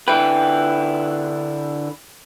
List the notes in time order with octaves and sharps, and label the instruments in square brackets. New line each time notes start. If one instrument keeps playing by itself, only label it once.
[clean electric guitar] D3 E4 B4 [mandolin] G5